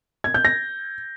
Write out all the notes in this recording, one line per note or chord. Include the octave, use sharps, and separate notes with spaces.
G#6
G6
A#6